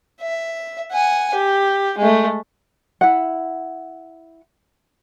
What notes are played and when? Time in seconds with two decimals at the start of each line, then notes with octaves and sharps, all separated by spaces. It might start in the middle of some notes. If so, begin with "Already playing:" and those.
0.21 E5
0.92 F#5 G#5
1.35 G4
1.98 G#3 A3
3.01 E4 F#5